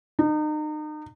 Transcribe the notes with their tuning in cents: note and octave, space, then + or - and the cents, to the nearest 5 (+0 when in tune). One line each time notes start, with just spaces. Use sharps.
D#4 -35